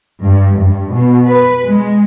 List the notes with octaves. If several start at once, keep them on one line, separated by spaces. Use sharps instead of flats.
G2
G2
B2
B4
G#3